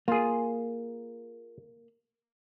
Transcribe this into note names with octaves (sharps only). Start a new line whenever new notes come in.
A#3 F4 G#4